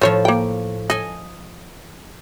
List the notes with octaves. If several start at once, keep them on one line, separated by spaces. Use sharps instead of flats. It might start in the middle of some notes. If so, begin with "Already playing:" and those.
A2 F3 C5 C#5
A#3 G5
A4 D#5 G#5